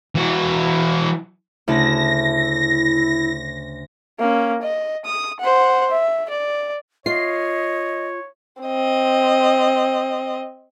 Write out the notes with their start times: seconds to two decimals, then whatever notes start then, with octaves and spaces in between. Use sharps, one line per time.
0.15 E3 F#4
1.68 D2 C#3 E4 A5 A#6
4.19 A#3 C#4
4.62 D#5
5.05 D#6
5.40 C5 F#5
5.91 E5
6.30 D5
7.06 F4 C#5 D#5 C7
8.63 C4 D#5